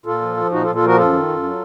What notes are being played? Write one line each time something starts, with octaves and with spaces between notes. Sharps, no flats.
A#2 F4 A4
F3
F3
A#2 D#4 F#4
F4 A4
A#2
F4 A4
F3 F#4 A#4
F#2 F4 A4
D#3
F#2
F#3